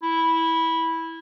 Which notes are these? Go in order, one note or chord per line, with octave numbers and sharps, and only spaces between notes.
E4